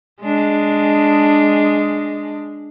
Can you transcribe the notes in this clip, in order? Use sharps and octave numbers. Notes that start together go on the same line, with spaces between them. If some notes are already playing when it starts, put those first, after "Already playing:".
G#3 D4